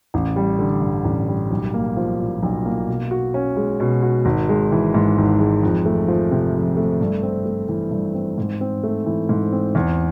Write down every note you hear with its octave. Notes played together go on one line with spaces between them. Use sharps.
A1
G3
D3
G2
A1
G3
B1
A#3
F3
A#2
B1
A#3
B2
F#4
C#4
G#3
B2
F#4
G#1
G#3
E3
G#2
G#1
G#3
F2
A3
F3
C3
F2
A3
G2
C4
A3
E3
G2
C4
G#2
C4
A3
E3
G#2
C4
E2